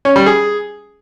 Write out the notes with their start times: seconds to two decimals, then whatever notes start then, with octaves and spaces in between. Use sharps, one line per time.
0.05 C#4
0.16 G3
0.26 G#4